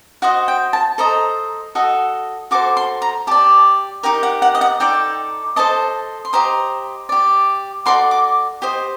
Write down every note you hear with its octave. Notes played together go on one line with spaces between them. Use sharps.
F#4 C5 D#5 F#5
G5
A5
A4 C5 D#5 A#5
F#4 A4 D#5
F#4 A4 C5 D6
C6
A#5
G4 D5 A5
D#4 G4 A#4 G5
F#5
F#5
D#5
F#5
D#4 A4 D5 G5
A4 C5 D#5 A5
C6
G4 C5 D#5 A#5
G4 D5
F#4 A4 D5 C6
D6
G4 C5 D#5